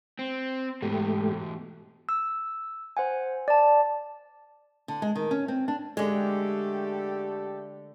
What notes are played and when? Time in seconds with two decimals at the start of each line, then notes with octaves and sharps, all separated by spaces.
0.19 C4
0.82 E2 G#2 B2 A3 G4
2.09 E6
2.97 C5 F#5 G#5
3.48 D5 A5
4.88 D3
5.02 G#3
5.15 D#3
5.31 C#4
5.48 C4
5.68 D4
5.97 D3 G#3 A3 G4 A4